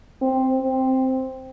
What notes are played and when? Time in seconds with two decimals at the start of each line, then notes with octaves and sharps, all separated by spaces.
0.22 C4
0.61 C4